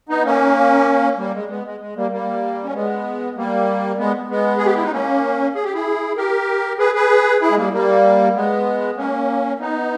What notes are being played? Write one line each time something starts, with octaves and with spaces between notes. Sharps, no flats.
B3 D#4
A#3 C#4
G3 A#3
G#3
G#3 B3
G#3
G#3
G3 A#3
G3 A#3
C#4
G#3 B3
G3 A#3
G#3 B3
G#3 B3
G#4
G4
E4
D#4
A#3 C#4
G#4
G4
E4 G#4
G4 A#4
G#4 B4
G#4 B4
E4 G#4
G#3
G3 A#3
G3 A#3
G#3 B3
A#3 C#4
B3 D#4